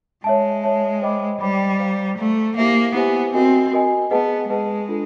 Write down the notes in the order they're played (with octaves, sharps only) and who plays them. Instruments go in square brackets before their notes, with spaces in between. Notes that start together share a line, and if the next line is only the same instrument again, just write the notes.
[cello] G#3 [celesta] C#5 E5 A5
[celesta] C#5 E5 A5
C5 D#5 G5 B5 D6
[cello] G3 [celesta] C5 D#5 G5 B5 D6
[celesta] C5 F5 A#5
[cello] A3 [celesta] C5 F5 A#5
[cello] A#3 [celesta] E4 G4 C5 E5 G#5
[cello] B3 [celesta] E4 G4 C5 E5 G#5
[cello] C4 [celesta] F#4 A#4 D#5 G#5
[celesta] F#4 A#4 D#5 G#5
[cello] B3 [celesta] G#4 B4 D#5 F#5 A5
[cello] G#3 [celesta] G#4 B4 D#5 F#5 A5
[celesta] D4 F4 A4